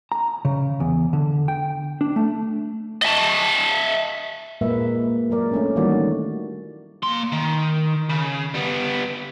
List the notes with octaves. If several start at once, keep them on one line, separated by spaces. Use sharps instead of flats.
A#5
C#3
E2
D3
G5
D4
A3
D#5 E5 G#5 A5
A#2 G#3 A#3 B4 E5
F#3 G#3 A#4 D5
A3 C#4 D4
D#3 E3 G3 A#3 F#4 D5
A#3 C6
D#3
C#3
G3 B3